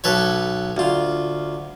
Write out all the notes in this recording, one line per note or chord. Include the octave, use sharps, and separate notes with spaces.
B1 A4 B4 C#5
D2 F4